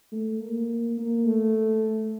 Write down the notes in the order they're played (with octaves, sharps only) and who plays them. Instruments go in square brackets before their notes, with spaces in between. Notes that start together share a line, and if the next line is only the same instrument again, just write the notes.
[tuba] A3
A#3
A#3
A3